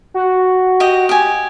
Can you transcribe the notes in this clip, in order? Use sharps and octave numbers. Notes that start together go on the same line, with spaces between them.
F#4
G4 D#5
G4 G#5